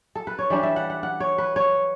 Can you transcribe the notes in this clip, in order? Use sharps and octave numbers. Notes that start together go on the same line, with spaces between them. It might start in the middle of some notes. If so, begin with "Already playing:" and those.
A4
B4
C#5
E3 G3 D4 D5
E5
F#5
F#5
F#5
C#5
B4
C#5